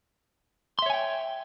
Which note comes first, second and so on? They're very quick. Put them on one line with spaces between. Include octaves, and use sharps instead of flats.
C6 E5 C#5 G#5 G5